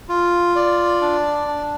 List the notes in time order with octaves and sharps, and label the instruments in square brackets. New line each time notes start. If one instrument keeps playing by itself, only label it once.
[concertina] F4
D5
D4
D4